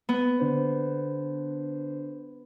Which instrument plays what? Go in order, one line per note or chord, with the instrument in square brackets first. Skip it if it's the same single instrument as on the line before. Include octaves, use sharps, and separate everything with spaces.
[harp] B3
[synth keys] D3 D4 C5